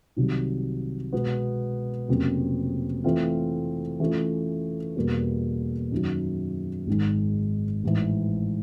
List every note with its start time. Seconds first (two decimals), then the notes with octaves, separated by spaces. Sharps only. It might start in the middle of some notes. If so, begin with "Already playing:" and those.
0.16 C2 C3 D#3 F#3
1.13 B2 G#3 B3
2.08 F1 F2 C#3 F#3 A#3
3.04 E3 A3 C4 F4
4.00 E3 A3 C#4 F4
4.96 E2 B2 G3 A#3
5.92 F#2 D#3 F#3
6.87 G#1 G#2 D#3 G#3
7.83 A1 G#2 E3